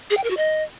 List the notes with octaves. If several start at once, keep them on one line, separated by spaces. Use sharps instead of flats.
G#4
G5
A#4
F#4
D#5